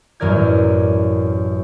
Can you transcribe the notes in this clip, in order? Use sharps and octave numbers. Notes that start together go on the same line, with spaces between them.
A1 F#2 E3 A#4 D5 G#6